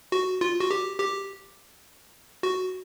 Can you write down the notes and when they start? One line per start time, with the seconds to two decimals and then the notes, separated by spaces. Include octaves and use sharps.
0.12 F#4
0.41 F4
0.60 F#4
0.71 G4
1.00 G4
2.43 F#4